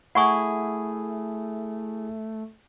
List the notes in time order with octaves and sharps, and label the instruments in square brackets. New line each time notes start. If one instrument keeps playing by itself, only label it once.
[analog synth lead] A3 [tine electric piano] E4 G#4 [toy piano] F#5 C#6